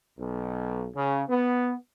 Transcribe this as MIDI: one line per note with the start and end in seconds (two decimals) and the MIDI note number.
0.18 0.88 35
0.96 1.24 49
1.29 1.74 59